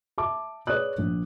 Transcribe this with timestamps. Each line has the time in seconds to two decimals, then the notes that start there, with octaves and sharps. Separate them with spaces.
0.18 E5 A5 D6
0.67 G#4 B4 C#5 D5 D#6 F#6
0.98 A#1